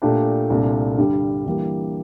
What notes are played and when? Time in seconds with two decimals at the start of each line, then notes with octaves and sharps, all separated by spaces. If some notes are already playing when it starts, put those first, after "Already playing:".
0.02 A#2 A3 D4 G4
0.50 C2 A#2 A3 D4
0.98 G2 D3 G3
1.45 G2 E3 G3 A#3